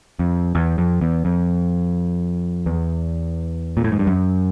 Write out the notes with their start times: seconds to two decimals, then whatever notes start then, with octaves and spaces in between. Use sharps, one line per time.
0.19 F2
0.55 E2
0.78 F2
1.01 E2
1.25 F2
2.66 E2
3.77 A#2
3.84 A2
3.92 G#2
3.99 G2
4.07 F#2